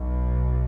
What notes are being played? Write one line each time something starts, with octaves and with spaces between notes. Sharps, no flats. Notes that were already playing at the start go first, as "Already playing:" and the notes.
Already playing: B1 B2